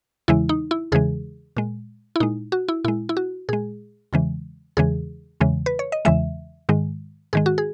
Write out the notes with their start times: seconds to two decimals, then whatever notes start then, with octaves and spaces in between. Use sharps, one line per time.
0.28 E2 C#3 E3 G#3 E4
0.49 D#4
0.71 E4
0.92 E2 C#3 E3 G#3 G#4
1.57 A#2 G#3
2.16 E4
2.20 A#2 G#3 D#4
2.52 F#4
2.68 E4
2.84 A#2 G#3 E4
3.09 E4
3.17 F#4
3.49 A#2 G#3 G#4
4.13 E2 C#3 E3 G#3
4.77 E2 C#3 E3 G#3 G#4
5.40 E2 C#3 E3 G#3
5.66 B4
5.79 C#5
5.92 D#5
6.05 E2 C#3 E3 G#3 E5
6.69 G#2 D#3 G#3
7.33 G#2 D#3 G#3 G#4
7.46 F#4
7.58 G#4